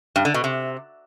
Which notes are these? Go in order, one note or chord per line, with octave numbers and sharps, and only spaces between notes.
G2
D3
B2
C3